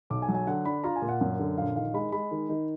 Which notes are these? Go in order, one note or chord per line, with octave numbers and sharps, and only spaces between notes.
B1 D6
G#5
F#3
G#5
D3 F#5
D4 B5
F4 A#5
G#5
A#2
F#5
F#2
D3
A#1 F5
D#3 F5
G#3 B5
G#3 B5
D#3
D#3